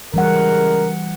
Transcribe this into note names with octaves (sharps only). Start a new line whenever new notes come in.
C#3 E3 G3 G#3 A#4 F#5